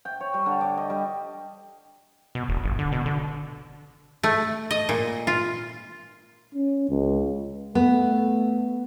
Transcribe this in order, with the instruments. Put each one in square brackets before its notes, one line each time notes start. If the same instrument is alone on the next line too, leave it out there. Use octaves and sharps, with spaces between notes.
[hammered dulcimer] G5
C#5
G3
D3
D5
D#5
G3
[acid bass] B2
E1
G1
D3
B2
D3
[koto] A3
D#5
A#2
F4
[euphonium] C#4
C#2
[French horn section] A3 [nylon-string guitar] B3